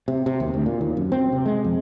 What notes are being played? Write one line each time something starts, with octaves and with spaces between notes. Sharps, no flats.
C3
C3
D#2
D2
A#2
D#2
F#2
C4
C3
G#3
F2